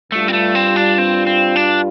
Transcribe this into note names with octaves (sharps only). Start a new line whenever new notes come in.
G2 G3 A3 F4
C4
A3
C4
D4
C4
C4
D4